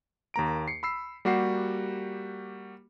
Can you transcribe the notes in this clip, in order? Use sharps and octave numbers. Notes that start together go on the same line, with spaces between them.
D#2 A#3 A#5 D7
C7 C#7
B5 E6 C7
G3 A#3 F#4 G4 F#5 C7